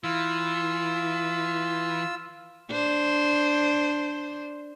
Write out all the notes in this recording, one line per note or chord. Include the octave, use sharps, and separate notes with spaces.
E3 F4 E6
D4 C5